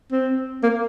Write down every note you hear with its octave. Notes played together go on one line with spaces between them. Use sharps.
C4
A#3